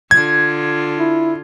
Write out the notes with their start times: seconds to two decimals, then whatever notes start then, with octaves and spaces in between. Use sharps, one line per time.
0.11 D3 F4 G#6
0.99 E4